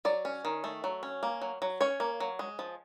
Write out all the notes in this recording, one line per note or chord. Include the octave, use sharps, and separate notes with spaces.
F#3 D5
C#4
D#3
A3
F#3
C#4
A#3
F#3
F#3
C#4 C#5
A#3
F#3
G#3
F3